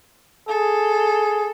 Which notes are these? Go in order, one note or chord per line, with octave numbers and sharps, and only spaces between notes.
G#4 A4